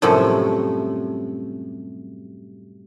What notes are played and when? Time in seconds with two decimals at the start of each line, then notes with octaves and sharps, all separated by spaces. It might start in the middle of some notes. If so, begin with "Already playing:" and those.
0.02 F#2 A2 C3 F3 G3